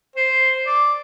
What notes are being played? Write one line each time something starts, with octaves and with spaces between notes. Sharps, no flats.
C5
D5